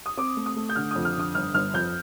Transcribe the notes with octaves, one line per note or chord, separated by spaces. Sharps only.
D#6
C4 D6
A3
D#6
A3
G6
D3 F6
F2 D#6
F6
D3 D#6
G1 F6
G1 F6
F2 G6